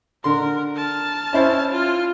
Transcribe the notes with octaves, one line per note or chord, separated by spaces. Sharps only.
D3 A#4 C6
A5 F6
C#4 E4 C5
F4 F6